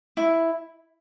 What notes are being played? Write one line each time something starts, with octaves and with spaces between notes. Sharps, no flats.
E4